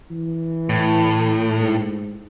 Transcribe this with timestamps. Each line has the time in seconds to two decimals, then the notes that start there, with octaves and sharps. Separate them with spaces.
0.10 E3
0.69 A2
1.58 G#2